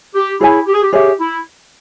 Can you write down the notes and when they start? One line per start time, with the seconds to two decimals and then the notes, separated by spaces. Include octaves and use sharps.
0.15 G4
0.40 E4 G#4 C#5 G#5
0.66 G4
0.74 G#4
0.82 G4
0.93 G4 G#4 C#5 E5
1.19 E4